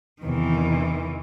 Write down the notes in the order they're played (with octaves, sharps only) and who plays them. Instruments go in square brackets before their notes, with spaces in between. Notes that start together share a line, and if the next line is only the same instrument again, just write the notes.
[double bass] E2 C3 [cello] D#3 E3